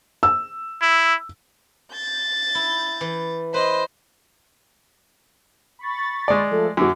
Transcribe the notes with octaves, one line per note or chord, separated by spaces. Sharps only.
E6
E4
G6 A6
E4
E3
B4 C5 D#5
B5 C#6 A6
G#3 D5
F3 A3 A4
F#2 F#3 D6